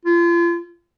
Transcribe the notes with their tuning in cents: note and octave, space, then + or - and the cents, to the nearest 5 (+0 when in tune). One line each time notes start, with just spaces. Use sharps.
F4 -35